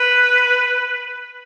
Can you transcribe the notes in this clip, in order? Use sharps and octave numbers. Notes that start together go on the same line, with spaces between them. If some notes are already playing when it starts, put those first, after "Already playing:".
Already playing: B4